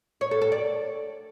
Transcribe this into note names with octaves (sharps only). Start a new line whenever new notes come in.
C#5
A4
A4
D5